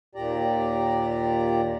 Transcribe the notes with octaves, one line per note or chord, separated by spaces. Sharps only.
D#2 A#2 G4 D5 A#5